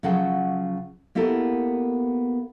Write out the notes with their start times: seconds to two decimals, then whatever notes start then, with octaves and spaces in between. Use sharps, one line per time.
0.03 C#3 F3 F#3 F#5 G5
1.15 A#3 B3 E4 G4 A4 A#4